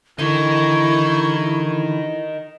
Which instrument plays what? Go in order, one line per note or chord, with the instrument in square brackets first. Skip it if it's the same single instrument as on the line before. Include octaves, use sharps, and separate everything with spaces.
[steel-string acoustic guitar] D3 E3 G4 [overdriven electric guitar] D#4 A#4 [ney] E4 [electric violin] C#6 G#6